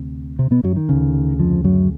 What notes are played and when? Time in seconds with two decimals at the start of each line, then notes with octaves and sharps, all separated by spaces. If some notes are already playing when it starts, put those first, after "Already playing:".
Already playing: D2 C3
0.39 C3 C4
0.51 B2 B3
0.64 F#2 F#3
0.76 D#3
0.89 D2 C#3
1.40 F2 F3
1.64 F#2 F#3